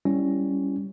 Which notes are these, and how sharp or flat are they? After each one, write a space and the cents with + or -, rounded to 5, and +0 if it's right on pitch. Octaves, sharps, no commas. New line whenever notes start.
G3 +0 C#4 +0 E4 +0